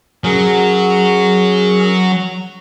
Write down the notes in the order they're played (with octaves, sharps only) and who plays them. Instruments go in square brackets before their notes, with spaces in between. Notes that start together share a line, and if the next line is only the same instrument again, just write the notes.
[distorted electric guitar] F#3 [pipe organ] C#4 G#4 A#4